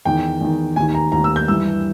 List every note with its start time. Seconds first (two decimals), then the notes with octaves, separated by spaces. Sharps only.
0.05 E2 D#3 G5
0.41 E2 D#3
0.76 D#2 D#3 G#5
0.94 A#5
1.12 D#2 D#3 A#5
1.24 E6
1.36 G6
1.48 G2 E3 E6